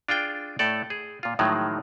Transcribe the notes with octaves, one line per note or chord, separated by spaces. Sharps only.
D4 F4 G#4 G5
A2 A3 A4 D5
G#4
A#2 F4
A2 D#3 F3 F#3 G#3